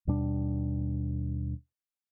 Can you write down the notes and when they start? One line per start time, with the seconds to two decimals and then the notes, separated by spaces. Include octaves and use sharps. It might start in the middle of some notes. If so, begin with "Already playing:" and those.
0.07 D#2 B2 G3 D4